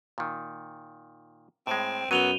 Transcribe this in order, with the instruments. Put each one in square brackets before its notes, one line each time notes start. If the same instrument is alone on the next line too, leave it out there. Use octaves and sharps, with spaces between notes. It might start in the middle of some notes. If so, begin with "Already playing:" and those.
[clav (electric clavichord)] A#2 D#3
[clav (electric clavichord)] A2 G#3 [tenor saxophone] C4
[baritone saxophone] F#2 [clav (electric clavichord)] F#3 [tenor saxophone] B3 [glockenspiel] D#7 F7 G7